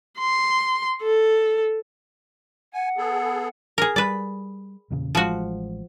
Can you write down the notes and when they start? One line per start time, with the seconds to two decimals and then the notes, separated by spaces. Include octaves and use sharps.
0.19 C6
1.02 A4
2.73 F#5 G#5
2.98 B3 G#4 A4
3.78 G#4 A#4
3.96 G3 B4 D5
4.91 E2 A#2 C#3
5.15 A1 F3 G#3 F#4